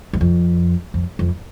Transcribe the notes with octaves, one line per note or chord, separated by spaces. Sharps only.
E2
F2
F2
F2